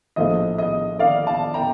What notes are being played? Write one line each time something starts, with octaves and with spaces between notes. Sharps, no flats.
A#1 A2 F3 A3 D#5
D#5
D5 F5
F5 A5
G5 A#5